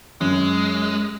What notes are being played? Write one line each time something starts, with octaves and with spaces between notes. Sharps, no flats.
F#2 G#3